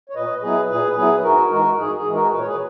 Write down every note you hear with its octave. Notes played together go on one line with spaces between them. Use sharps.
C#5
A#2 B4 D#5
F#3 B3 E4 G#4 B4
A#2 G#4 B4
F#3 B3 E4 G#4 B4
G#2 F#4 A#4
E3 G#3 F#4 A#4
G#2 G#4
G#4
E3 G#3
F#4 A#4
A#2 B4
C#5
G#4 B4